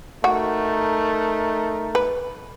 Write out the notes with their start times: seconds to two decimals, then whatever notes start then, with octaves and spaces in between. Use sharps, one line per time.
0.24 A3 D#4 F#4 A#4
1.95 B4